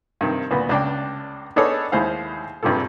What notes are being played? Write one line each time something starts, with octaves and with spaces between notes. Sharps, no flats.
G2 C3 D#3
D2 A#2 B3
C#2 D4 G5
B3 D4 D#4 G#4 A4 C#5
D#2 G#3 E4 C5 F5
A#1 G2 C3 G3 F4 A4